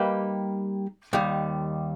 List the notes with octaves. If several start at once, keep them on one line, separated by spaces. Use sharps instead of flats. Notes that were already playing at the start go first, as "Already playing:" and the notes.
Already playing: G3 A#3 D#4 G4 B4
D#2 D#3 G3